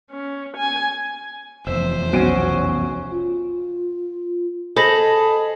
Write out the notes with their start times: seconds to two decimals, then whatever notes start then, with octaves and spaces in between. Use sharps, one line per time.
0.12 C#4
0.58 G#5
1.67 F1 E2 F3 C5 E5
2.13 B1 C#4 F#4 D7 D#7
3.11 F4
4.76 G#4 A4 C5 D#5 B5 A#6 F#7